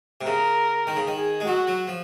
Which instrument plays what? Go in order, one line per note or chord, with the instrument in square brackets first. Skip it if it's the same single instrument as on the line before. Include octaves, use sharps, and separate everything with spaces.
[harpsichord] C3
[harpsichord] C#3 [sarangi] A#4
[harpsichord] D#3
C#3
D#3
[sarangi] G#4
[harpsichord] G#3
[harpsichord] F#3 [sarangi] F#4
[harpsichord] F#3
F3